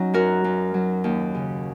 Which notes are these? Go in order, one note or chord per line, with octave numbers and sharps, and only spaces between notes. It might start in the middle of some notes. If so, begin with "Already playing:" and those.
Already playing: F#3 C#4 D#4
F#2 F#4 A#4
F#2
F#3
D#2
C#3